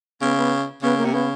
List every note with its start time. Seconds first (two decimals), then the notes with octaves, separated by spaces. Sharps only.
0.21 C#3 B3
0.37 B3
0.82 C#3 B3
0.98 A#3
1.05 C3
1.13 C#3 B3